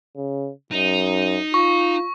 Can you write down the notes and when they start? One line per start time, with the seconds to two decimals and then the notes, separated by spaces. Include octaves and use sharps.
0.16 C#3
0.72 F#2 D#4
1.54 F4 C#6